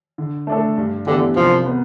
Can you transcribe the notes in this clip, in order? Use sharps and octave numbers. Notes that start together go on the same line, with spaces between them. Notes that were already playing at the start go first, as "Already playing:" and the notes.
D3
A3 D4 A4
G2
D3 E3 B3 D4 G4
C2 F3
B3